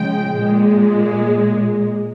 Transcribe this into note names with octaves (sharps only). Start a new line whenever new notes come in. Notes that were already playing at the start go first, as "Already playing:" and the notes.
Already playing: C#3 F3 G#3 G5
A#2 G#3